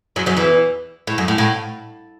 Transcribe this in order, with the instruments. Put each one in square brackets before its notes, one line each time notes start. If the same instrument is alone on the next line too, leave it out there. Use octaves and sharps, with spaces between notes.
[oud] F#2 F#3
F#2 F#3
E2 E3
A2
F#2
A2
A2